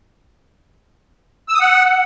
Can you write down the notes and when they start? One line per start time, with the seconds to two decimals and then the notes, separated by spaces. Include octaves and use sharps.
1.49 E6
1.54 D#6
1.60 F#5